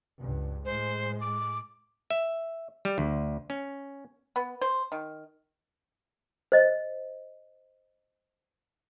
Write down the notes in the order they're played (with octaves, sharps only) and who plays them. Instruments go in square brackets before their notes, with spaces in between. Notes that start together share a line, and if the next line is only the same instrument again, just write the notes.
[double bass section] C#2 G2
[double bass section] A2 G#3 [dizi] C5
[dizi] D6
[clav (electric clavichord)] E5
G3
D2
C#4
[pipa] B3
C5
D#3
[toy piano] C5 D#5